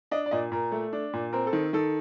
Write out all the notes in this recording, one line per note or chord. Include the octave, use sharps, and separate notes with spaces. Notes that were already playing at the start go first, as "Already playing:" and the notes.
D4 D#5
D5
A#2 D#5
A#2 A#4
A3
D4
A#2
C4 A#4
A4
D#3
D#3 A4